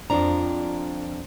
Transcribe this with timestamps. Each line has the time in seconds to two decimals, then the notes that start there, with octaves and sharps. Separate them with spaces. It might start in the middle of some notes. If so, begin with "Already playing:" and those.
0.10 F2 F3 D4 A#5